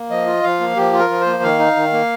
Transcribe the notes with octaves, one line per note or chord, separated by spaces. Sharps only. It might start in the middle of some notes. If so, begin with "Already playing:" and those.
Already playing: A#3
F3 D#5
F4
F3 F5
A#3
F3 G4
F4
A#4
F3
C5
A#3
D#3 F5
D#4
D#3
A#3